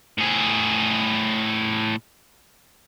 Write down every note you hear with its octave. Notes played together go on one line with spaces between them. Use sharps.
A2 G#4